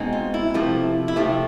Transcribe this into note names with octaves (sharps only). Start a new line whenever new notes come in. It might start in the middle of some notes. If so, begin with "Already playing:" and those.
Already playing: B2 G#3 C4 D#4
F4
E4
C3 F3 A3 C4
E4
C3 F3 A3 C4 F4